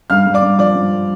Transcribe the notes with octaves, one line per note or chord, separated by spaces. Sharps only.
G2 F5 F6
G2
D5 D6
G2
F3 D5 D6
G2